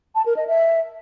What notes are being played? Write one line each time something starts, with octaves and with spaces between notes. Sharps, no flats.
A5
A#4
D#5
E5